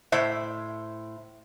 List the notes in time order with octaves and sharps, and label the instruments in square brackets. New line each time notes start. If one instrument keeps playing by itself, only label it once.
[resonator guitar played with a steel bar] A2 C5 E5